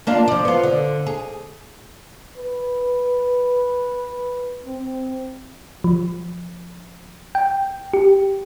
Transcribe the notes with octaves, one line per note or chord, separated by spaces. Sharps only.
A#3 D4 F4
F3 D5
B3 F4
D3
G#4
B4
C4
F3
G5
G4